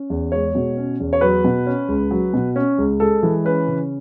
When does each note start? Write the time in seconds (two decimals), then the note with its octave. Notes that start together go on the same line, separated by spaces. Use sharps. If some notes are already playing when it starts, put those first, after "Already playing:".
Already playing: C#4
0.10 E2
0.32 G#3 C#5
0.55 B2
0.77 C#4
1.00 E2
1.13 C#5
1.21 F#3 B4
1.44 B2
1.66 C#4
1.88 C#2
2.11 F#3
2.34 B2
2.56 C#4
2.78 C#2
3.00 G#3 A4
3.23 E3
3.45 C#4 B4
3.67 C#3